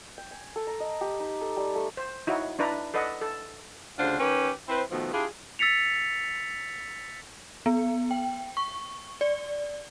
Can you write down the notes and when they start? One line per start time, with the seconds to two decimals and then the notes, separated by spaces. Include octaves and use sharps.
0.18 G5
0.31 G#5
0.56 A4
0.67 A#5
0.80 D#5
1.01 G4
1.20 D#4
1.41 A4
1.57 G3
1.76 A3
1.97 C5
2.27 D#4 E4 F#4 C#5
2.59 D4 E4 B4 A#5
2.94 A4 B4 D5 D#5 F#5
3.21 A4
3.98 D2 C#3 D4 F4 C5 F#5
4.20 D#3 C#4 G4 B4
4.69 C4 E4 B4 C5
4.90 B2 D#3 F3 A3 B3
5.13 D4 E4 F4 G4 G#4
5.59 E6 A6 B6 C#7 F7
7.66 B3
8.11 G5
8.57 C#6
9.21 D5